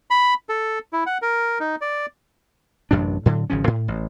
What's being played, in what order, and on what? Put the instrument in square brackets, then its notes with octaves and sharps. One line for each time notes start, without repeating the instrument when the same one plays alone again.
[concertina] B5
A4
E4
F#5
A#4
D#4
D5
[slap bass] A1 F#2 C3 D4
A2 D3 F#3
G#1 C#3 F3 C#4
A2
A1